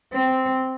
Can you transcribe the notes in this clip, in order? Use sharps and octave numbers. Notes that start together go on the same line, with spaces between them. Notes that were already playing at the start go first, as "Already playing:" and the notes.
C4